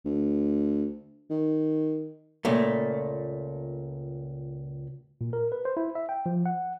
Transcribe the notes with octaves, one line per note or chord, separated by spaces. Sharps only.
D2
D#3
C#2 A#2 A3
A#2
A#4
B4
C5
E4
E5
G5
F3
F#5